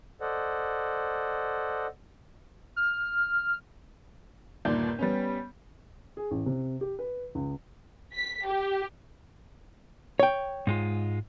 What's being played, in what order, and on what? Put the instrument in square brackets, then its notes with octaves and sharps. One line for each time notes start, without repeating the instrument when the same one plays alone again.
[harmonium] A4 C5 D5 D#5 F#5
[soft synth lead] F6
[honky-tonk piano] G1 D#2 A#2 D5 G6
G3 B3 C#4
[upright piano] G#4
A1
C3
G4
B4
C#2
[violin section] B6
G4
[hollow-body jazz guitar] C#5 G5
[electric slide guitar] G#2 G#3 F4